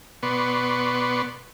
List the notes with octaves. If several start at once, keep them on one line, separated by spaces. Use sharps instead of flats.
B2 B3 B4 D5 C6 C#6